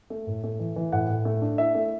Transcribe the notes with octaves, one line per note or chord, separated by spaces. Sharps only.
A3
A2
A3
E3
E3
A2 F#5
A2
A3
D4
E4 E5
A3